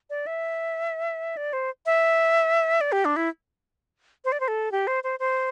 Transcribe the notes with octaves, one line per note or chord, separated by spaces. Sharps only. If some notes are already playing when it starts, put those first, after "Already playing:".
D5
E5
D5
C5
E5
D5
G4
D4
E4
C5
D5
C5
A4
G4
C5
C5
C5